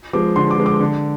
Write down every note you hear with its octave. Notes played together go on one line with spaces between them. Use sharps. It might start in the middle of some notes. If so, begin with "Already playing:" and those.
F3 G#3 D6
D3 C6
D6
F3 G#3
D6
D3